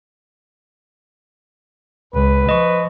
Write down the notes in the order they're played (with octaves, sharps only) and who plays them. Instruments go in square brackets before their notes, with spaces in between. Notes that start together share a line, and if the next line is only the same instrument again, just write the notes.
[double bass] C#2 [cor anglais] B4
[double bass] F3 [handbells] D#5 C#6